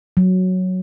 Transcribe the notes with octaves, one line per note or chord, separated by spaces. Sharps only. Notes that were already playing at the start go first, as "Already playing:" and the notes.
F#3